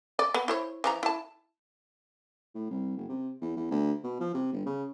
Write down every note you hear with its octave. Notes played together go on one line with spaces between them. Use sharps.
D5
B3
E4 C5 C#5
E3 F3 A#5
E4 A5
A2
C2
F#1
C3
E2
E2
D2
B2
F3
C3
G1
C#3